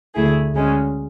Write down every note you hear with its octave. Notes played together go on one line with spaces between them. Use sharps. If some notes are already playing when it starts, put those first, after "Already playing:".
D2 D3 A3 E4 G#4
D2 C#3 G#3 C#4